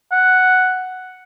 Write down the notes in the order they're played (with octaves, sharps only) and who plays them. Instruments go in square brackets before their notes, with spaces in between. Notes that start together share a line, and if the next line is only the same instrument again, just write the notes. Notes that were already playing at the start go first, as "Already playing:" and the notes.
[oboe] F#5